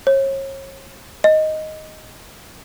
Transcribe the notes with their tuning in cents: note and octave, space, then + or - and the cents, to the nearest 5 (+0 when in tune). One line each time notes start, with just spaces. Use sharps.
C#5 -35
D#5 +5